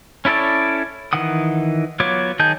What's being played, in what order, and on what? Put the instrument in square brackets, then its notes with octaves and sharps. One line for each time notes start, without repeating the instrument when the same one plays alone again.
[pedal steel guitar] C#4 E4 A4 C#5 D5
D#3 E3 F#5 D#6
F#3 B3 F4 C#5 D6
D#3 G#4 D#5 A5 G6